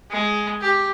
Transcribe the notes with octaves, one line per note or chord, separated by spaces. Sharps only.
G#3
G4